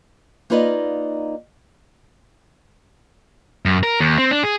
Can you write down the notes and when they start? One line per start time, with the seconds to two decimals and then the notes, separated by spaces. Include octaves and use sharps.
0.50 A#3 D#4 F4 B4 D5 D#5
3.65 F#2
3.83 A#4
4.00 D#2
4.18 C4
4.31 D4
4.43 G#4